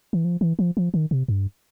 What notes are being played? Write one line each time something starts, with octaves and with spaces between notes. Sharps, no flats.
E3
F3
E3
F3
F3
D#3
C3
G2